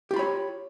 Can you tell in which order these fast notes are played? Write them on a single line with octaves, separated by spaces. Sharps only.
G4 F4 B5 C#5